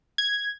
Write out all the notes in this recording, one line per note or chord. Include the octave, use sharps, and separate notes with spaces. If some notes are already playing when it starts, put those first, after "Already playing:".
G#6